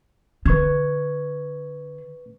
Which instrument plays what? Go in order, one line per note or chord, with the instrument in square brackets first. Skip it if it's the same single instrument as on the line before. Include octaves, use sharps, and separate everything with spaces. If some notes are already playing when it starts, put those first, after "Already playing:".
[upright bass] D3 [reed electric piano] B4 C#6 G#6